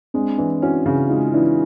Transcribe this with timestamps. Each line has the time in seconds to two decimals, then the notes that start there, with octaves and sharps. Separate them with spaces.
0.14 G#3 C4 D4
0.38 E3 D4 E4
0.62 C#4 E4 F#4
0.86 C#3
1.10 G#3 D#4 F4
1.33 E3 D4 E4